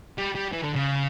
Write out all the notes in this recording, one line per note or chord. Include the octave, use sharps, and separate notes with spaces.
G3
G3
E3
D3
C#3